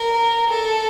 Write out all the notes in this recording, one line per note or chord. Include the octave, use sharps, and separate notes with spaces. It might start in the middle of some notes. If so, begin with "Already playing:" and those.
Already playing: A#4
A4